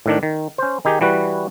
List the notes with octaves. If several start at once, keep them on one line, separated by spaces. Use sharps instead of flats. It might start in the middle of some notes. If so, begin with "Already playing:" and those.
A2 D#3 D4
D#3
C#4 C5
D#3 D#4 G4 G#4
E3 G3 F#4 B4